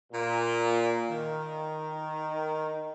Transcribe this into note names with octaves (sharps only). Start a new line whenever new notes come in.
A#2
D#3